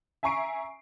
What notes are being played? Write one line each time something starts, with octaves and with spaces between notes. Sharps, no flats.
E5 G#5 A#5 C#6 C7 D7